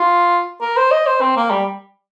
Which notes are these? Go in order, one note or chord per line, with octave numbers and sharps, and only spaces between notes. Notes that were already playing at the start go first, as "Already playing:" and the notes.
Already playing: F4
A#4
C5
D#5
C5
C4
A#3
G3